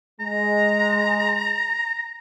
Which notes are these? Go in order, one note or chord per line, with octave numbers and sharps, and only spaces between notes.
G#3 A#5